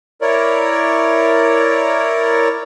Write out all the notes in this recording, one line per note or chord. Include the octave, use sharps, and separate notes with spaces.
E4 A#4 C#5 D5